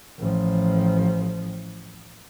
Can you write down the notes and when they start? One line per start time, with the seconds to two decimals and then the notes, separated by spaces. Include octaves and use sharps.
0.19 A1 F3